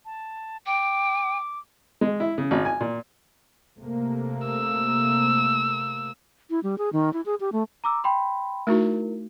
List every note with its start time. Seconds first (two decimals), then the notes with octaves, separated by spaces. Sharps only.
0.05 A5
0.66 G5 D6
2.01 G#3
2.20 E4
2.38 C#3
2.51 G#1
2.65 G#5
2.80 A#2
3.79 C3 A3 A#3
4.47 E6
6.50 E4
6.63 G3
6.78 G#4
6.93 D#3
7.13 E4
7.26 G#4
7.40 G4
7.52 A3
7.84 A#5 D6 E6
8.04 G5 B5 C6
8.67 A3 D#4 E4 F#4 A#4